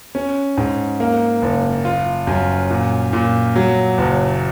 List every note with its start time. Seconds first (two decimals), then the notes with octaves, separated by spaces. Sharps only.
0.15 C#4
0.57 G#2
1.00 A#3
1.42 F#1
1.85 F4
2.27 F#2
2.70 A#2
3.13 A#2
3.56 F#3
3.98 F#1